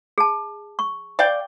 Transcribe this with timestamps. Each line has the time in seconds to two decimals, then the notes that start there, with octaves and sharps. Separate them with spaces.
0.18 G#4 A5
0.79 C#6
1.19 D5 F5 G5